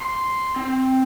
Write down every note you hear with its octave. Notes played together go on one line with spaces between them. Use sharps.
C6
C4